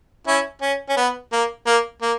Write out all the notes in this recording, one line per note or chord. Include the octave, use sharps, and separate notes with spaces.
C#4 E4
C#4
C#4
B3
A#3
A#3
A#3